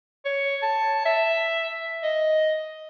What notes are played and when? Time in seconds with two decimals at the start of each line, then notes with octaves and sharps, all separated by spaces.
0.25 C#5
0.63 A5
1.06 E5
2.03 D#5